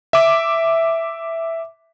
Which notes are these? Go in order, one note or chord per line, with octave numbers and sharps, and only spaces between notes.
E5 D6